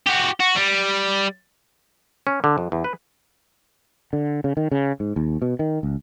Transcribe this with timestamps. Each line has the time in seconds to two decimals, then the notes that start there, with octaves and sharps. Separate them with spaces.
0.07 F#4 G4
0.40 F#4
0.56 G3
2.27 C#4
2.44 D3
2.58 F2
2.72 E2
2.84 B4
4.13 D3
4.44 C#3
4.57 D#3
4.72 C#3
5.00 G#2
5.16 D#2
5.42 B2
5.59 D#3
5.83 C#2